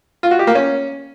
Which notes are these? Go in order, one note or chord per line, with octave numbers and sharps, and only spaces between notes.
F4
F#4
G4
A#3
C#4